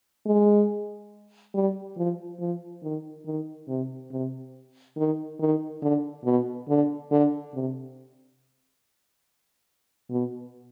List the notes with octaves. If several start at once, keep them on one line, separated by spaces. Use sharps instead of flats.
G#3
G3
F3
F3
D#3
D#3
C3
C3
D#3
D#3
D3
B2
D3
D3
C3
B2